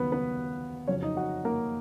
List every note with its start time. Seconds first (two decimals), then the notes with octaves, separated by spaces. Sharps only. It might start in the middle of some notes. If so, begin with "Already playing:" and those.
Already playing: D#2 C#3 F#3 B3 B4
0.12 B3 B4
0.87 F2 C#3 F#3 C#4 C#5
1.03 D#4 D#5
1.17 F#4 F#5
1.45 A#3 A#4